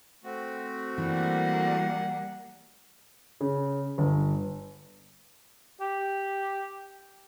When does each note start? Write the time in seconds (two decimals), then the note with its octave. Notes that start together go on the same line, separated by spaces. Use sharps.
0.24 A3 C4 F#4
0.98 E3 G3 A#3 F#5
3.41 C#3
3.98 G1
5.81 G4